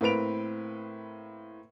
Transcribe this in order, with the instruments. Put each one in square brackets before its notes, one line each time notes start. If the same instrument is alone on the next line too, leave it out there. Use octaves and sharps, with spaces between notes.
[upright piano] A2 A#3 C4 B4 D7 F7